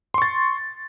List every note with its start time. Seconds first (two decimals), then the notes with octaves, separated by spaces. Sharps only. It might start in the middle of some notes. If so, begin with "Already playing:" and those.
0.14 C6
0.18 C#6
0.22 A6